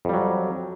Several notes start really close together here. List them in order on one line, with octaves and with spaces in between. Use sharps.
F2 G3 F#3